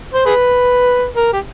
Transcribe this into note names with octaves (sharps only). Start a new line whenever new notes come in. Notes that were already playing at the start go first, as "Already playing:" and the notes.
C5
G#4 B4
A#4
G4